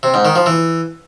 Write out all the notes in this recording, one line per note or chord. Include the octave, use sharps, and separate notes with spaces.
C3
G#2
D#3
F3
E3